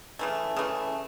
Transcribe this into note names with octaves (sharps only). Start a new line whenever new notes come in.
C#3 E3 A3
C#3 E3 A3